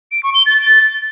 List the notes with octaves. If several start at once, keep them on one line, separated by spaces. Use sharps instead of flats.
D7
C#6
G7
A6